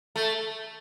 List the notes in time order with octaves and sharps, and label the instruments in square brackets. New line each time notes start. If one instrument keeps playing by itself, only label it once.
[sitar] A3